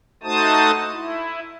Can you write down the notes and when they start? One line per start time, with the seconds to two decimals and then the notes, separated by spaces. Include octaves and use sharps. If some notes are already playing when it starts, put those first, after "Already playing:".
0.23 A3 D#4 F#4 C5 A5 D#6
0.93 E4